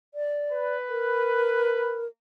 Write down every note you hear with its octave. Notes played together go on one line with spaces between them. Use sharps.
D5
B4
A#4